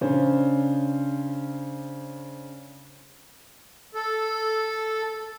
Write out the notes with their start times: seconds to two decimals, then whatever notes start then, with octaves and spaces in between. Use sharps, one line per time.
0.01 C#3 C#4 D4 C5
3.94 A4